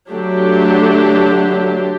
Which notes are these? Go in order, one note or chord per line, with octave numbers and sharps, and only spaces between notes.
D3 F#3 A3 D4 G4